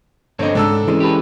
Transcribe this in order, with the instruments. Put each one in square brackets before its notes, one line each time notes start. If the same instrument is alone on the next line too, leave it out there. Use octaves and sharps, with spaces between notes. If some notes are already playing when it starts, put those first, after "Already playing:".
[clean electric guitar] G2 D3 C4 [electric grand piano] C#5 D#5
[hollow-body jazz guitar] C#2 [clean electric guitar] G#2 [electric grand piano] D4 A4 E6
[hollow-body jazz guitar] E3 G#3 C#4
[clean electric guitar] G4 B4